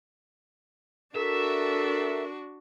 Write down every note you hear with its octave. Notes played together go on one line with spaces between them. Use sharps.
D4 F#4 A4 A#4 E5